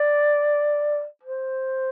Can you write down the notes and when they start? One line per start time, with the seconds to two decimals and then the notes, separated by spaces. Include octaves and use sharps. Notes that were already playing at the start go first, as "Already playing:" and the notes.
Already playing: D5
1.23 C5